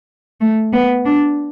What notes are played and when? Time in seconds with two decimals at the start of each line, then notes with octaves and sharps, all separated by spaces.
0.41 A3
0.73 B3
1.05 D4